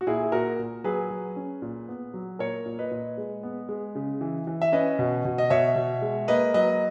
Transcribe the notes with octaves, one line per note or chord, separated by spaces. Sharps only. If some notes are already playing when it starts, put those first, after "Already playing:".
F#4
A#2 E4 G#4
G#4
A#2 F#4 A#4
A#2
F#3 G#4 B4
F#3
C#4
A#2
B3
F#3
A#2 A#4 C#5
A#2
B4 D#5
A#2
G#3
B3
G#3
C#3
E3
E3
E5
C#4 B4 D#5
B2
B2
D#5
B2 C#5 E5
B2
G#3
A#3 B4 D#5
F#3 B4 D#5